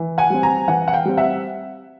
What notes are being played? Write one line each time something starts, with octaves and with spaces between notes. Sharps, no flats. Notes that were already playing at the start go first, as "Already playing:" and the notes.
Already playing: E3
F#5 G#5
G3 C4
G#5 A#5
E3 F#5 G#5
F#5
F5 G5
G3 C4
E5 F#5